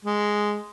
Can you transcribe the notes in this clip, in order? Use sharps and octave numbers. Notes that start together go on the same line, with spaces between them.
G#3